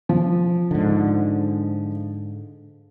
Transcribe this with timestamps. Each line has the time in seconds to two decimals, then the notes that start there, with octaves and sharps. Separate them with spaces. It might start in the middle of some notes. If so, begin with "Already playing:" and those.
0.09 F3
0.71 G#2 D3